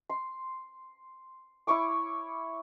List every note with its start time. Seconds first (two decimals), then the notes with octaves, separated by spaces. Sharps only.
0.10 C6
1.67 E4 C#5 C#6 D6